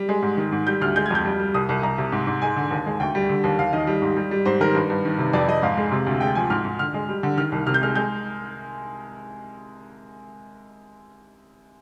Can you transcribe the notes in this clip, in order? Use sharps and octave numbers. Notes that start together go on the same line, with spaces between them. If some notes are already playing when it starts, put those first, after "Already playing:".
Already playing: G3
G#3
G#2
D#3
G#2
G3 G6
D2 F6
G#3 G6
G#6
F2 G6
G3
G3
C2 D#6
C2
C2 A#5
C3
G#2
G#2
G#3 G#5
D3
D#2
G#3
D2 G5
G3
D3
D#2
D#2 F5
D#3 D#5
G3
G#2
G3
G3
G#2 C5
D#3 A#4
G2
G2
D#3
C3
F2 D5
F2 D#5
G#2 F5
G#3
C3
D2
G#3 G5
F3 G#5
G#2 F6
G#2
D3 F6
G#3
G3
D3
D#3 F6
C2
C3 F6
G6
G#3 F6
G#3 G6